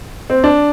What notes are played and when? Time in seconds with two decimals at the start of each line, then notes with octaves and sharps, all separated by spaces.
0.30 C4
0.44 D4